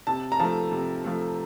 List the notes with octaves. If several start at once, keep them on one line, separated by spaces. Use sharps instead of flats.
C3 A5
A#5
F3 A3 A5
C3
F3 A3